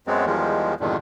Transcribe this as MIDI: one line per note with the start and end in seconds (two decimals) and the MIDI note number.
0.07 0.26 42
0.07 0.26 54
0.07 0.26 56
0.07 0.26 59
0.07 0.26 60
0.26 0.74 40
0.26 0.74 51
0.26 0.74 53
0.26 0.74 55
0.26 0.74 56
0.80 0.97 40
0.80 0.97 43
0.80 0.97 46
0.80 0.97 50
0.80 0.97 51